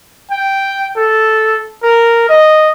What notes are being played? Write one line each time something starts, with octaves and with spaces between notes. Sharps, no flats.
G5
A4
A#4
D#5